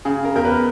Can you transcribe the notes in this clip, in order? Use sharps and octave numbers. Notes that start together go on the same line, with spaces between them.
C#3 G#4
A#4
E2 A#4
B4